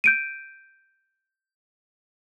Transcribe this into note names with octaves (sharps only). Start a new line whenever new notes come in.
G6 D7 D#7